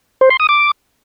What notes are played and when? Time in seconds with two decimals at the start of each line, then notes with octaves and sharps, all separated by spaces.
0.21 C5
0.30 C6
0.40 D#6
0.49 D6